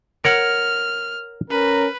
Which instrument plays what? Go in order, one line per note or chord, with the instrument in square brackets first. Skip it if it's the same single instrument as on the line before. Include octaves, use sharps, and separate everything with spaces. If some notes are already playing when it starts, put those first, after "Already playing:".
[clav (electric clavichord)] A#4 C#5 F#5 [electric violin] F6
[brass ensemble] C#4 A#4 [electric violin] B4